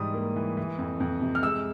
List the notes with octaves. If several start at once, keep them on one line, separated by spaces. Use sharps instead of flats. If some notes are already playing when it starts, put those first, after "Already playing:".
Already playing: G#2 E3 G3 D#6
A#3
E3
E3
F2
F2
C3
F6
G#3 E6